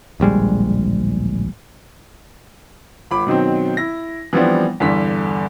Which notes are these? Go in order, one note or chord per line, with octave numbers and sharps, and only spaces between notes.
D1 A#1 G3 G#3
G1 B5 D6
B2 D#3 F#3 C4
E4 A#6
E3 F3 G3 B3 C4 D4
E2 G2 D3 B6